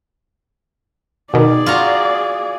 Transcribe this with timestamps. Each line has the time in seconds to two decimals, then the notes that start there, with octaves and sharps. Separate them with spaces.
1.34 B2 D#3 G#4 D5
1.66 F4 F#4 A#5